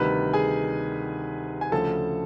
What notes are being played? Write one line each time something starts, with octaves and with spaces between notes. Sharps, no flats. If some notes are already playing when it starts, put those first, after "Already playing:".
Already playing: D2 C3 D#3 G3 B4 B5
G#4 G#5
G#5
D2 C#3 F3 A4 A5